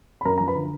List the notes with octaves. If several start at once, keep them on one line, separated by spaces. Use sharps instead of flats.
B5
F#2 A#4 A#5
F3 A#5
B4 B5
D3